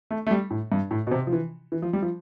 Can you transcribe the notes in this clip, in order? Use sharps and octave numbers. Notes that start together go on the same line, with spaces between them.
A3
A3
G3
A2
G2
A2
B2
C3
F3
E3
E3
F3
G3
F3